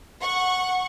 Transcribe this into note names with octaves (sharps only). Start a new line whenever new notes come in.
F#5 C#6